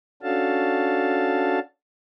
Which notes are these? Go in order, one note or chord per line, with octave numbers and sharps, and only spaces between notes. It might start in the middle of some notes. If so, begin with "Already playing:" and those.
C#4 D4 F#4 A4 F5 A5